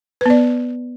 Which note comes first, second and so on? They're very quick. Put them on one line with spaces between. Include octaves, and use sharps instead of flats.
B4 B3 D5